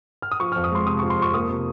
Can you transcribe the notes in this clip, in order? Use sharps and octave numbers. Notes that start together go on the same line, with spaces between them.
F6
D#6
F3 C#6
F2 F6
D#6
G#3 C6
C3 D#6
F3 C#6
C6
F2 C#6
A#3 D#6
C3